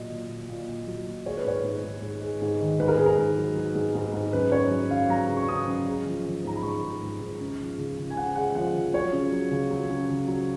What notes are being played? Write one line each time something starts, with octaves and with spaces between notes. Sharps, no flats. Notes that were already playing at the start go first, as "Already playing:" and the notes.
Already playing: A#2 F#3 D#5
A#2
A#2
A#2
A#2
F#3
A#2
G#3 C#5
B4
G#2 C#5
G#2
G#2
G#2
G#3
G#2
D#3
G#2 B4
A#4
G#2 G#4
A#4
G#2
F#3
F#3
G#2
G#2
G#2
F#2 B4
F#2 C#5
F#3
F#2 F5
F#3 A#5
C#3
C#6
C#3 D#6
F#2
G#3
F3
F3
G#2 A#5
B5
G#2 C#6
G#2
G#2
G#2
C#3
F3
C#2
C#2
G#5
C#3 F#5
G#3 F#5
F3 F#5
F3
F#3 C#5
C#3
F#3
C#2
F#3
C#3
C#2
F#3